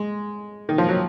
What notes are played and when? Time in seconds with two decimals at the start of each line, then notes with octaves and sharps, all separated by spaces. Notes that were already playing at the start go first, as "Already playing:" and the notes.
Already playing: G#3
0.69 D#3
0.78 F3
0.89 F#3